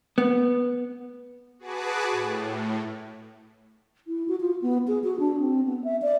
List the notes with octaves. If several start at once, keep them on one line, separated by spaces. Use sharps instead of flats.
B3
F#4 G#4 B4 A5 D6
A2
E4
F#4
F4
B3
G#4
F#4
D4
C4
B3
E5
D5